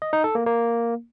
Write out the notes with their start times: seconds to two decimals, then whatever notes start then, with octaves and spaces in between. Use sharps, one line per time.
0.02 D#5
0.13 D#4
0.24 A4
0.35 A#3
0.46 A#3